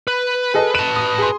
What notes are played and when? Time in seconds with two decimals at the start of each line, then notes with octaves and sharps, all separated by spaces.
0.08 B4
0.54 G#4 A4 D#5
0.75 B4 A5 D#7
0.96 D#6
1.18 G#4 C6